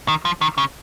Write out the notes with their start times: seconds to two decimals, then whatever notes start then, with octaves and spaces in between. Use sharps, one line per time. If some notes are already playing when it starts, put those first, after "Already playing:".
0.08 D#3
0.25 F3
0.41 D#3
0.58 C#3